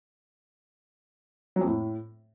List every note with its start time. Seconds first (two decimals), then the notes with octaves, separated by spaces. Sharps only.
1.56 F#3
1.61 F2
1.66 A2